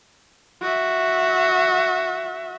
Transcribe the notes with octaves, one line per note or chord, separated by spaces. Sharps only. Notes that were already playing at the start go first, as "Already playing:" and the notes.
F#4 E5